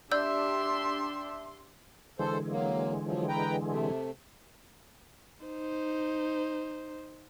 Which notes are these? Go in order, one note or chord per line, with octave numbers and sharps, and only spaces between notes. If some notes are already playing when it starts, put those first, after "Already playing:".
D4 G4 D5 E5 C6 E6 G6
D3 E3 G#3 A4 C5
F#3 A#3
F3 F#3
B4 G5 A#5
C3 A3
D#4 C5